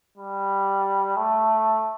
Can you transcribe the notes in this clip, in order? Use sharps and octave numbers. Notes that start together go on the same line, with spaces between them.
G3
A3